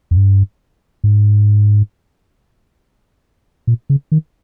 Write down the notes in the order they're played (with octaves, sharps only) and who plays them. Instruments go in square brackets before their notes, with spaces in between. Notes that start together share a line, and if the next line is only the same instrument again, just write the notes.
[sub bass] F2
G2
G#2
A#2
C#3
D#3